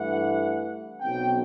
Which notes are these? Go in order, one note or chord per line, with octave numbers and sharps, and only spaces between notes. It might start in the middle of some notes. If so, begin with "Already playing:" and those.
Already playing: G2 E3 A3 F#5
B1 B2 F#3 C4 G5